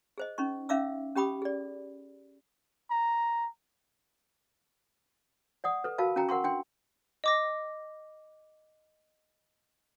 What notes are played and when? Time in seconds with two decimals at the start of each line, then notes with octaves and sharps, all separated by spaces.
0.18 G#4 C5 D#5
0.38 C#4 D#4 C#6
0.69 C#4 D#4 E5 F5 D6 E6
1.16 C#4 G4 G5 B5 D6 D#6
1.42 G#4 D5
2.91 A#5
5.64 D5 F#5 D#6
5.84 A4 B4
5.98 F#4 A#4 F5 A5 B5
6.16 C#4 F#4 G5 A#5
6.29 A#4 F#5 C6 C#6
6.44 D4 G5 C6
7.24 D#5 D6 A#6